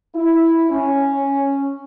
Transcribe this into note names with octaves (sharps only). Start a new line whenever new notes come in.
E4
C#4